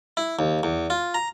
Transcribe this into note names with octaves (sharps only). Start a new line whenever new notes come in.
E4
D#2
E2
F4
A#5